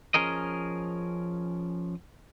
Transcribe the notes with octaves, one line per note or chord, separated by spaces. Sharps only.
F3 C#4 G#4 A#4 D#5